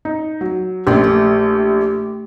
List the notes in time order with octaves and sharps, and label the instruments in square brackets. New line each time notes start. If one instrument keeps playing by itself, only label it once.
[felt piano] D#4
F#3
[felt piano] A#1 [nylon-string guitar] A3 C#4 D4 [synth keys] G4
[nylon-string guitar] A3